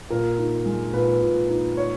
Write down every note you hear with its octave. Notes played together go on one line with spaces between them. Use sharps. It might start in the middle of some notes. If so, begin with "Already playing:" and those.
A#2 A#4
D#4
G#3
A#2 B4
A#2
D#4
C#5